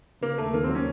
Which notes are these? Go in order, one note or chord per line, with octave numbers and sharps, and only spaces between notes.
C#3 A#3
D#2 A3
D#2 A#3
C4
F#3
C#4